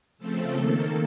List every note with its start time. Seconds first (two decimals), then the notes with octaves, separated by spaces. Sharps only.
0.18 C#3 F3 A3 C4 A4
0.53 D#3 A#3 A4